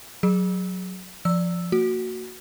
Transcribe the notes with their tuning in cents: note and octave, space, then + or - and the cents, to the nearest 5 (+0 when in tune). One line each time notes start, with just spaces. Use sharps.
F#3 -5 G#4 +0 E6 -20
F3 +0 D5 +0 E6 +0
A#3 -30 F#4 +0